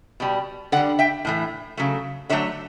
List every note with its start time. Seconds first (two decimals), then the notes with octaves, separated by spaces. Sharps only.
0.20 B2 G3
0.72 D3 D5 F#5
0.76 G3
0.99 E5 G5
1.25 A2 E3 A3
1.77 C#3 F#3 A3
2.29 D3 F#3 A3 C#5 E5